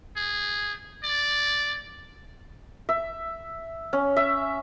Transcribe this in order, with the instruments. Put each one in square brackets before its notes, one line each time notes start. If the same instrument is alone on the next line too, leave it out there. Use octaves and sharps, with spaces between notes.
[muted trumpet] G#4
D5
[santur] E5
C#4
E5